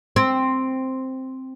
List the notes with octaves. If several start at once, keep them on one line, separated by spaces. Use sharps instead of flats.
C4